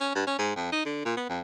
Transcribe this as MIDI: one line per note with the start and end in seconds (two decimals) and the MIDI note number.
0.01 0.13 61
0.15 0.24 43
0.27 0.36 61
0.39 0.54 44
0.56 0.72 41
0.72 0.84 63
0.86 1.00 50
1.05 1.16 46
1.17 1.25 59
1.29 1.40 41